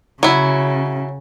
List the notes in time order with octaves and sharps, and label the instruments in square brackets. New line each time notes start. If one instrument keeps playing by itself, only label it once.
[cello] C#3 [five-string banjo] F#3 E4